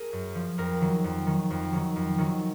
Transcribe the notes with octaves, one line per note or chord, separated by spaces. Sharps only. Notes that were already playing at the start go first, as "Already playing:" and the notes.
Already playing: G#4 A#4
F#2
F3
F2 A#4
D#3 F#3
F2
D#3 F#3
F2
D#3 F#3
F2
D#3 F#3